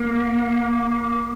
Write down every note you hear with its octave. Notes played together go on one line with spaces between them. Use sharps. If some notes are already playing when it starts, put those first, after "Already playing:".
Already playing: A#3